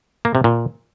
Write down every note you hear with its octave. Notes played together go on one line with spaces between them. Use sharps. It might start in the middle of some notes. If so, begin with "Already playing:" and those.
A#3
C3
A#2